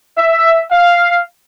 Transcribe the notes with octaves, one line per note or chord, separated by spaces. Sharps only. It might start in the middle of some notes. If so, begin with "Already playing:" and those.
E5
F5